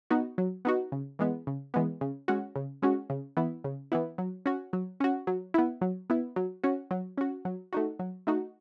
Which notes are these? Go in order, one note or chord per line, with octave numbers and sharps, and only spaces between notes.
B3 D#4 F#4
F#3
B3 D#4 F#4
C#3
E3 G#3 B3
C#3
E3 G#3 B3
C#3
G#3 C#4 F#4
C#3
G#3 C#4 F#4
C#3
E3 B3 E4
C#3
E3 B3 E4
F#3
C#4 F#4
F#3
C#4 F#4
F#3
B3 E4
F#3
B3 E4
F#3
C#4 F#4
F#3
C#4 F#4
F#3
A3 D#4 F#4
F#3
A3 D#4 F#4